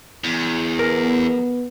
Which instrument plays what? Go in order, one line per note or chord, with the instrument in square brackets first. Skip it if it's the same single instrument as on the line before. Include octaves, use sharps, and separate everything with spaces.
[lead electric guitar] E2
[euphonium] B3 [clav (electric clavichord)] A#4